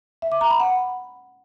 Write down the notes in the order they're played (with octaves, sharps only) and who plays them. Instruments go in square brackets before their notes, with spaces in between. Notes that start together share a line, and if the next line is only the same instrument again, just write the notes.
[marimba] E5
D6
A#5
B5
F#5